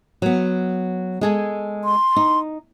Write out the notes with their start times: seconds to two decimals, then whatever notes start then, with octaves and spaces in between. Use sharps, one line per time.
0.22 F#3 B3
1.21 G#3 G#4 A4
1.84 C6
2.16 D#4